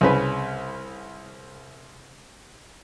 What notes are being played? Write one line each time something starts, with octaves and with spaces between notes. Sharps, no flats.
C2 C#3 B4